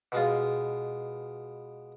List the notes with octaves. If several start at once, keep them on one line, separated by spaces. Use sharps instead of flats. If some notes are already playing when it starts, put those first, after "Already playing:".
B2 G#3 F4